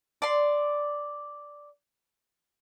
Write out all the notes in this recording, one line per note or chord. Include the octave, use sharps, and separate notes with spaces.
D5 C6